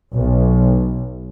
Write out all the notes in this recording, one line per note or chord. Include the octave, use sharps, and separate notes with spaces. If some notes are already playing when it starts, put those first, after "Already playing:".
B1